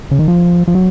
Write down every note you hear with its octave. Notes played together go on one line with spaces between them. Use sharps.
C#3
D#3
F3
F3
F#3